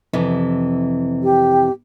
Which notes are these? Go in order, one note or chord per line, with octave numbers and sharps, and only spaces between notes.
F2 C3 E3
G4